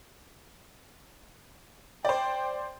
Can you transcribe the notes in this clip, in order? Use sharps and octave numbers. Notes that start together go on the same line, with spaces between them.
C5 D5 G5